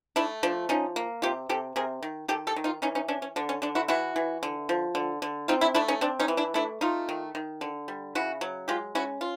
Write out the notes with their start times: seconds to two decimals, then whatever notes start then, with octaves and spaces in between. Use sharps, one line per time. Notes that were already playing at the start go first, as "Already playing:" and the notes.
0.16 A3 D4 E4
0.43 F3 D4
0.69 F3 C#4 D#4
0.96 A#3
1.22 C3 F4 G4
1.49 C3 G4 A4
1.76 C3 G#4 A#4
2.03 D#3
2.28 D#3 G4 A4
2.47 G4 A4
2.56 D#3
2.64 D#4 F4
2.82 E3 C#4 D#4
2.95 C#4 D#4
3.08 C#4 D4
3.22 C#4
3.36 D3 D4
3.49 C#4
3.62 D3 D4
3.75 E4 F#4
3.88 E3 E4 F#4
4.16 E3
4.43 D3
4.69 F3
4.95 D3
5.22 D3
5.48 C4 D#4 F4
5.61 D4 E4
5.75 A3 D4 E4
5.88 C#4 D#4
6.01 C4 D4
6.20 C#4 D#4
6.28 E3
6.37 D4 E4
6.54 A3 D4 E4
6.81 A3 D#4 F4
7.09 D#3
7.35 D#3
7.61 D3
7.88 G3
8.15 C#3 E4 F#4
8.41 F#3
8.68 G#3 F4 G4
8.95 C#4 E4 F#4
9.21 F4